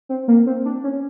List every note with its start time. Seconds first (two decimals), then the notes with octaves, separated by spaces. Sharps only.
0.09 C4
0.28 A#3
0.46 C4
0.65 D4
0.84 C#4